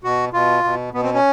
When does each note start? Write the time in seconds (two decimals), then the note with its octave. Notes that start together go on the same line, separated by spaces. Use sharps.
0.04 B2 F#4
0.33 B2 F4
0.64 B2
0.94 B2 B3
1.03 C4
1.14 C#4